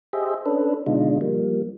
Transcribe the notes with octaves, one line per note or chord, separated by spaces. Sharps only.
G4 G#4 C5 D#5 E5
C#4 D4 A4 B4
B2 D3 G#3 D4 D#4 F4
F3 G3 A#3